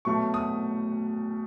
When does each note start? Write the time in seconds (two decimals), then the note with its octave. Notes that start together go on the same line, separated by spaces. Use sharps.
0.05 B2 F#3 A3 C#6
0.34 D#6